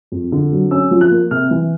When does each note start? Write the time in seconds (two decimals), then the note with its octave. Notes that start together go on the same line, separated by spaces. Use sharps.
0.12 F2
0.32 D3
0.52 F#3
0.71 C#4 E6
0.91 F3
1.01 F#6
1.11 A#3
1.31 C3 F6
1.51 E3